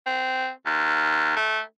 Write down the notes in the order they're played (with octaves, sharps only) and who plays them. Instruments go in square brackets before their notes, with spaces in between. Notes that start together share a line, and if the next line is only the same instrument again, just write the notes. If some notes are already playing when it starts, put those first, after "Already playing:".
[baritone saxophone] C4
D#2
A3